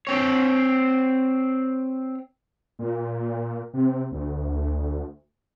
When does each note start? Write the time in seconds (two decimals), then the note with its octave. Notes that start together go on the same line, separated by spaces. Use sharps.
0.07 C4 C#5
2.79 A#2
3.74 C3
4.12 D2